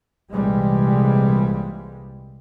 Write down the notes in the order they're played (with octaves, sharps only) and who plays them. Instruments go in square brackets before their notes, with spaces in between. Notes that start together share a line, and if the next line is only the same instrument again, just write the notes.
[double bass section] C2 A#2 E3 G3 G#3